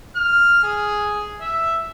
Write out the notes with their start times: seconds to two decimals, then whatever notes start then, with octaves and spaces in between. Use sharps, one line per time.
0.16 F6
0.64 G#4
1.41 E5